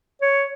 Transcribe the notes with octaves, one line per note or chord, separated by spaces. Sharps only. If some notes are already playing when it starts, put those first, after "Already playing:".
C#5